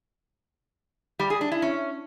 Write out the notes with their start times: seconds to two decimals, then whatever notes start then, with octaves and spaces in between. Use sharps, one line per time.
1.19 G3
1.30 G#4
1.41 D4
1.52 E4
1.62 C#4